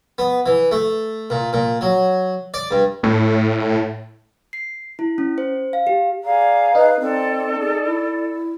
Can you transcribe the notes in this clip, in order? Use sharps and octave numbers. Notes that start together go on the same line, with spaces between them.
B3
E3
A3
A#2
A#2
F#3
D5
G2
A2
C7
E4
C#4
C5
F5
G4
G#4 D5 F5 A#5
D#4 B4
C4 A4 D5
G#4
E4